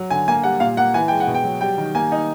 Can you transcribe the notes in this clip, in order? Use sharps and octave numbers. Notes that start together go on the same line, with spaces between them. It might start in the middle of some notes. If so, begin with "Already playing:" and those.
Already playing: F#3
D3 G#5
A#3 G#5
G3 F#5
A#2 F5
A#3 F#5
E3 G#5
G#3 G5
F#5
B2
G5
F#3
G3 G5
D#3
A#3 G#5
D#4